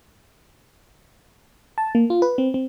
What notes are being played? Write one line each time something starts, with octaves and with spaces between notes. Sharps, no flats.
A5
A#3
F4
B4
C4
C4